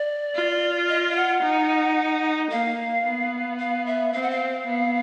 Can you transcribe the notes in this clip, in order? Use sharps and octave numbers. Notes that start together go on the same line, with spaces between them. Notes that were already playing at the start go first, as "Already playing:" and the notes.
Already playing: D5
F4
D#5
F5
F#5
D#4
A#3 F5
B3
F5
E5
C4 F5
F#5
F5
B3